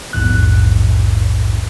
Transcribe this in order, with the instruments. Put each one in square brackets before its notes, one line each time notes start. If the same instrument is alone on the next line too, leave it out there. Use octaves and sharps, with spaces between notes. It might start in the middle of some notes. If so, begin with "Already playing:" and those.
[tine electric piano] A#1 E2 G#2 F#6